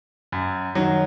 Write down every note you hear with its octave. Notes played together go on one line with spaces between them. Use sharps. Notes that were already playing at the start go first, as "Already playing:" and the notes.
F#2
D#3 F#3